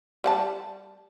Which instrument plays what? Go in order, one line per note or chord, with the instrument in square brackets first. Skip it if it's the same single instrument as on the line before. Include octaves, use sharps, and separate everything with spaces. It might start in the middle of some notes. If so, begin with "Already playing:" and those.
[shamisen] G3 F#5 A5